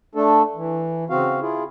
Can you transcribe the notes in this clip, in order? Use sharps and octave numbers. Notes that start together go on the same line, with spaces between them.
A3 D4 A4
E3
C#3 C4 F#4 F5
E4 F4 G#4